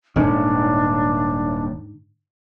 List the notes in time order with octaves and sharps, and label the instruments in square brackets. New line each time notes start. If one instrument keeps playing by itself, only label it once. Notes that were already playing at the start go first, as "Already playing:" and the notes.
[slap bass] D#1 C#4 [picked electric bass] G#2 D3 D#3 [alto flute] D4